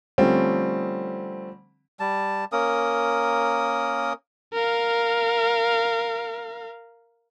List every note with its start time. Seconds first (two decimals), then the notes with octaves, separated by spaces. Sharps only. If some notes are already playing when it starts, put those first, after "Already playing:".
0.18 D3 F3 G3 A3 C4 C#4
2.00 G3 A5
2.52 A#3 C#4 A#4 D#6
4.54 A#4 F5